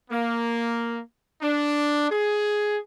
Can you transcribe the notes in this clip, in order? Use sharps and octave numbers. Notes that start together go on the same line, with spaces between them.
A#3
D4
G#4